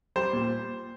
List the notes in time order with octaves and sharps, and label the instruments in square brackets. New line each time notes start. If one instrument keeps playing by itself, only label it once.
[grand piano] G3 C5
A#2